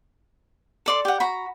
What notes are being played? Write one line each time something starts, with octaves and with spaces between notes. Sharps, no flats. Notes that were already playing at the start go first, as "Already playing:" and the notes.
A4 D5 C6
G4 F#5
F#4 A#5 B5